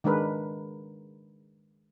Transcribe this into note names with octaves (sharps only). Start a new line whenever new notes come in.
D#3 G#3 D4 A#4 B4